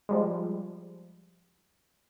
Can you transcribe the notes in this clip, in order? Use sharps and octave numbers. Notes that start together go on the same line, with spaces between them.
F3 G3 G#3